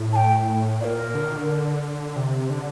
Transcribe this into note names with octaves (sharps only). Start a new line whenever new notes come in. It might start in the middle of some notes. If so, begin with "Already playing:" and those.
Already playing: A2
A5
G5
A#2 A#4 D5
D3
D#3
D3
C3
D3